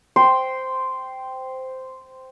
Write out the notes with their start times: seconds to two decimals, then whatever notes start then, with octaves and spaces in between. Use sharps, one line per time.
0.16 C5 G5 C6